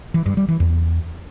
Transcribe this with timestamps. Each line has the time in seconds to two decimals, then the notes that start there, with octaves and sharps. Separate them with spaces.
0.14 E3
0.26 G2
0.37 G3
0.49 E3
0.60 E2